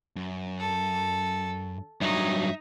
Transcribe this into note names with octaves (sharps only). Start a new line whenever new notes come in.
F#2
A4
G2 F#3 D#4 E5